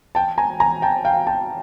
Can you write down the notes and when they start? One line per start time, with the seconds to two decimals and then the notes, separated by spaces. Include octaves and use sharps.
0.15 G5 A5
0.38 G#5 A#5
0.60 G#5 A#5
0.82 G5 A5
1.05 F5 G5
1.27 G5 A5